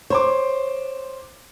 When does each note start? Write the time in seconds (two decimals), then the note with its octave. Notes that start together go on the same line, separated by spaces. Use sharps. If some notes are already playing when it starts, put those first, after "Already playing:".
0.10 C5 C#5 C6 D6